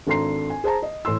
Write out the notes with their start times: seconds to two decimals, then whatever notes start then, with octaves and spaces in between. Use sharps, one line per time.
0.07 G#1 D4 A4 A#5 C6 C7
0.50 G#5
0.64 G#4 C5 A5 A#5
0.83 D#5
1.05 A2 E3 C6 E6